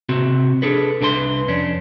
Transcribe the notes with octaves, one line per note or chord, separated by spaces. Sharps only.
C3 C4 F#4
D4 G#4 A4 B4
C2 D4 B4 G#5 C6
F2 C#4 D4